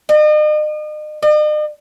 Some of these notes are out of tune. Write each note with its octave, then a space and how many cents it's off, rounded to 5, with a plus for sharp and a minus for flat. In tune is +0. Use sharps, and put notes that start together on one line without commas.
D#5 -40
D#5 -45